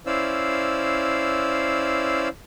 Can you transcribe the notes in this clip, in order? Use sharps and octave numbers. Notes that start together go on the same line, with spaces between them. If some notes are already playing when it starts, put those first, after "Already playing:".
C#4 E4 C5 D5 F5 E6